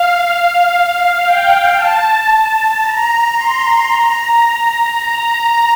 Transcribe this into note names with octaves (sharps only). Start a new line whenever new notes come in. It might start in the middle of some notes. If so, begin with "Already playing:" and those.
Already playing: F5
F5
G5
A5
A5
A#5
C6
A#5
A#5
A#5